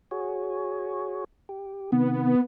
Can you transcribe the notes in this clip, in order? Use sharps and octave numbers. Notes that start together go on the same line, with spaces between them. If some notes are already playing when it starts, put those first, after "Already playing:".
F#4 G#4 C#5
G4
C3 D#3 B3